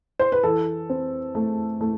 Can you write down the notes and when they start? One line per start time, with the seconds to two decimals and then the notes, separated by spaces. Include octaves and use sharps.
0.19 C5
0.32 B4
0.43 E3 A4
0.89 C4
1.35 A3
1.81 A3